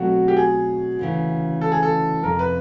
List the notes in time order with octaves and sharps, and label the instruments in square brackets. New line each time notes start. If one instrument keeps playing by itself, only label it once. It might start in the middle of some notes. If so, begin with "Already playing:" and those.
Already playing: [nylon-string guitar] B2 F#3 A3 C4 [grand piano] F#4
[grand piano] G4
G#4
[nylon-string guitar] D2 C#3 E3
[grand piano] A4
G#4
A4
[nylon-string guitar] F2 C3 F3 [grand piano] A#4
[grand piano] B4